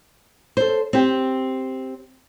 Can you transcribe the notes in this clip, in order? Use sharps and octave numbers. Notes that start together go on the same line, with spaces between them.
A4 C5
C4 G4